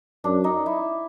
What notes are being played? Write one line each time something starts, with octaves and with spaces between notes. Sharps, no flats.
F#2 D4
D#4
E4